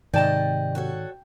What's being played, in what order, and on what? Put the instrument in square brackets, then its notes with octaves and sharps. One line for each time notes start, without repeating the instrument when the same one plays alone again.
[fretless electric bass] G#2 D#3 [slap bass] C3 [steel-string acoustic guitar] D5 D#5 [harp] G5 A5
[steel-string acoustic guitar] F#4 A4 C#5